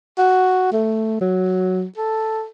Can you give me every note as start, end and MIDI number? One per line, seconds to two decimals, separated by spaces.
0.18 0.71 66
0.72 1.18 57
1.21 1.85 54
1.98 2.46 69